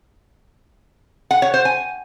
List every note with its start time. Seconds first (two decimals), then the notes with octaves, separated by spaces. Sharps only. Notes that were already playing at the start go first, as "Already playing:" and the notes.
1.31 F#5
1.42 C#5
1.54 C5
1.65 G#5